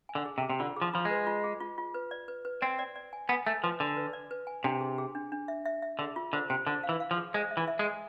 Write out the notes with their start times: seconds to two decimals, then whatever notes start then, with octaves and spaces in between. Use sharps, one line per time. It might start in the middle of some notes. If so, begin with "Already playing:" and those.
0.09 G#5
0.15 D3
0.25 G#4
0.38 C3
0.42 G#4
0.50 C3
0.60 D3 F4
0.76 G#4
0.82 F3
0.93 F3 F4
1.05 G#3
1.10 B4
1.27 F4
1.44 G#4
1.60 F4
1.78 F4
1.94 B4
2.11 D5
2.28 B4
2.45 B4
2.62 C4 D5
2.79 D5
2.96 D5
3.13 G#5
3.29 B3 G#5
3.46 A3 G#5
3.63 F3 B4
3.80 D3 G#5
3.97 B4
4.13 D5
4.31 B4
4.47 G#5
4.64 C3 D4
4.81 G#4
4.98 G#4
5.15 D4
5.32 D4
5.48 E5
5.65 E5
5.82 E5
5.99 D3 G#4
6.16 F4
6.33 D3 C5
6.50 C3 C5
6.67 D3 C5
6.83 F5
6.89 E3
7.00 F5
7.11 F3
7.17 G#4
7.34 G#3 C5
7.51 E5
7.57 E3
7.68 E5
7.79 G#3
7.85 G#5